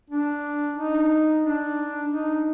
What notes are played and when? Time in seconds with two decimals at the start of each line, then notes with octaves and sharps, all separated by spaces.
0.10 D4
0.76 D#4
1.44 D4
2.10 D#4